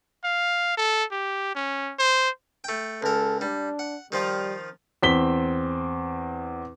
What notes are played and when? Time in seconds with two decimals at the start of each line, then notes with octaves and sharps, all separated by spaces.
0.24 F5
0.77 A4
1.12 G4
1.55 C#4
1.99 C5
2.64 A3 G5
3.02 C#2 A4 A#4
3.41 G3 D4
3.79 F#5
4.12 D#3 F3 G3 F4
5.03 E2 C4 B6 G7